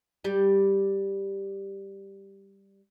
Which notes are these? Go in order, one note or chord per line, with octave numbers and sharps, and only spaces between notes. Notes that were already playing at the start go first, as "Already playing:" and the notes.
G3 G4